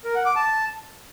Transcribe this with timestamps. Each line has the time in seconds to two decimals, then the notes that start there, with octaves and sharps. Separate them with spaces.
0.05 A#4
0.15 F#5
0.25 D6
0.36 A5